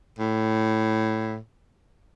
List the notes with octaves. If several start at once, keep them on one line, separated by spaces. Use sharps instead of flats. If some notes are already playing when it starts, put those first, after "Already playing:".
A2